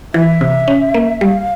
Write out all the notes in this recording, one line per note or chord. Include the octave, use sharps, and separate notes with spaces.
E3 E5
C3
C#4
A#3
G3 F5